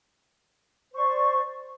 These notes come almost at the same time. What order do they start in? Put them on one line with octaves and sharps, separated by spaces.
C5 C#6 D5